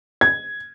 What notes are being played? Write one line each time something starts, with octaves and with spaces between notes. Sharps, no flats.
G#6